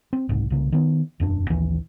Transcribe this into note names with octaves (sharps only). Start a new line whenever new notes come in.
C4
F#1 C2 G#2
C2 C#3 A#3
D#3 B3
E1 F#2 D4
A#1 D#2 E3